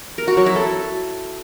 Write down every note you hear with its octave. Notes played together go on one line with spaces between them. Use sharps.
A#4
F#4
F#3
E4
A4